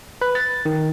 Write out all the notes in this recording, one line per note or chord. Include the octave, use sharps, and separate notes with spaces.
B4
A6
D#3